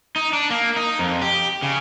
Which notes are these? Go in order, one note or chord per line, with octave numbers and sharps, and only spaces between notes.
D#4
D4
A#3
D#4
F2
G4
C#3